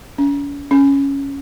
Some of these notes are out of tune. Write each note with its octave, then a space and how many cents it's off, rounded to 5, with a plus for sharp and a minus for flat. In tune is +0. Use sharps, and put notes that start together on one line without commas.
C#4 +40
C#4 +0